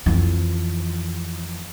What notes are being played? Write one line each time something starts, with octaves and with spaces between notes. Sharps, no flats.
F2 E3